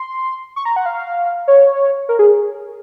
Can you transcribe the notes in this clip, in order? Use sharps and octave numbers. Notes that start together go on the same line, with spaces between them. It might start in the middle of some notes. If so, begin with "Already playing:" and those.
Already playing: C6
C#6
A#5
F#5
F5
C#5
A#4
G#4